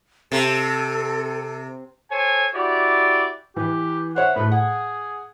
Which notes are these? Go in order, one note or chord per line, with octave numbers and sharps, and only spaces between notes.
C3 A4
A4 C5 C#5 G#5
E4 F#4 G4 D5
E3 G4 B4
C5 C#5 E5 F#5
A2 A3 B4
G#4 F#5